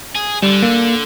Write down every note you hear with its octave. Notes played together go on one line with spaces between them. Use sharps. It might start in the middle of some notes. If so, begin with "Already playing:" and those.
G#4
D3 G3
A#3